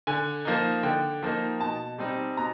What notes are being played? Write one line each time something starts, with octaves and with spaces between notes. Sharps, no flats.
D3 G#5
F3 A#3 D#4
D3 G5
F3 A#3 D#4
B2 A5
G3 C4 D#4
B2 A#5